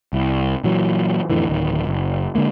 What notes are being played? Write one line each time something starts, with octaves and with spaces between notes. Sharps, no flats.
C2
A#2 E3 F#3
F2 A2 D3 E3
D1 D#3
F#1
D3 G#3 A#3